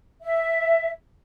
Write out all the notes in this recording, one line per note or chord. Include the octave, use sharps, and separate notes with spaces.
E5